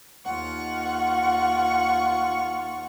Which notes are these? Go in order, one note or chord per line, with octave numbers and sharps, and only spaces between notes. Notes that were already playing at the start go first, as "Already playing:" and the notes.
D#2 F4 F#5 C#6